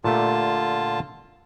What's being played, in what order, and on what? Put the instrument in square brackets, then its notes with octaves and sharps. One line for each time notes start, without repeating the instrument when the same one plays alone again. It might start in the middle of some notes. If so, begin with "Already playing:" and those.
[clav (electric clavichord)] A#2 A3 G4 [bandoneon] D3 F4 A5